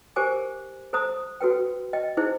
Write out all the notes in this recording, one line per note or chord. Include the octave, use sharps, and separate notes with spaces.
G4 A#4 C5 G#5 D6
A4 C5 A#5 D#6
F#4 A4 B4 G5
D#5 G5
D#4 E4 G#4 C5